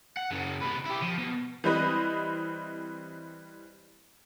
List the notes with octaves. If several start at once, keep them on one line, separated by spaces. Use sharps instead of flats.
F#5
F#2 C#3
C3 B4
E4 G4
F3
B2
E3 G3 C4 B4 D#5